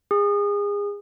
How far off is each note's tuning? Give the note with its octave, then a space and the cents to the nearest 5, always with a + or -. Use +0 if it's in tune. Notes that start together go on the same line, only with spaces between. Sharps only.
G#4 -30